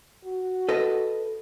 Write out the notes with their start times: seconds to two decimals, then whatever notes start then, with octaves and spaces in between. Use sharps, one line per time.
0.25 F#4
0.69 A4 B4 D#5